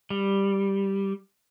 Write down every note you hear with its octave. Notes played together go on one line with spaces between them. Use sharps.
G3